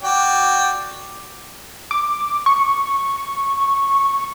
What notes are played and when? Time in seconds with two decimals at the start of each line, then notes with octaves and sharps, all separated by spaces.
0.03 F#4 D5 G5
1.91 D6
2.46 C#6